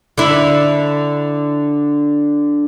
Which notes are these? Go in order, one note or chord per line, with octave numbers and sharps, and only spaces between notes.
D3 D4 E4